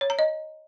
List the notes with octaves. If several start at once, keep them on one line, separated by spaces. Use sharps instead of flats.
C#5
A#5
D#5